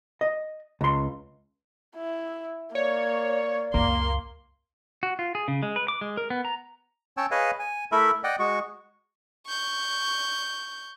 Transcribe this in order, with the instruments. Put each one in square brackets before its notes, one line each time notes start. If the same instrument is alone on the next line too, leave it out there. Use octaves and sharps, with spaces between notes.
[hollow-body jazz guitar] D#5
C#2 C6
[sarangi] E4
[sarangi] A#3 [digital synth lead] C#5 [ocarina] D5
[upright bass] C#2 F#2 [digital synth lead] A#3 [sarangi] C6
[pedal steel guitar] F#4
F4
G#4
C#3
G#3
B4
D6
G#3
A#4
B3
A#5
[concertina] C#4 C#5 G5 A5 E6
G#4 B4 C#5 D#5 F5 G#5
G#5
A3 E4 A4 A#4 E5 B5
D5 D#5 F#5 G5
G#3 F#4 C#6
[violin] C#6 G6